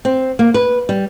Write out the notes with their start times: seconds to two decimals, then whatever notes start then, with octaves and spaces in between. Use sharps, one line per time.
0.05 C4
0.39 A#3
0.54 B4
0.89 G3